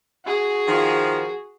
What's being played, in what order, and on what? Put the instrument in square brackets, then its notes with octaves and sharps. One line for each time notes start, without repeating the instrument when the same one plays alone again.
[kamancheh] F#4 G#4
[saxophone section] D#3 F3